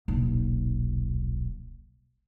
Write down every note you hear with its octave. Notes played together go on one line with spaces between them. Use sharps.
D#1 B1